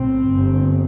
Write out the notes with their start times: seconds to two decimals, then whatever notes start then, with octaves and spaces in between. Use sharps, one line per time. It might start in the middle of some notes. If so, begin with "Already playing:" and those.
Already playing: B1 A2 C4
0.26 G1 G2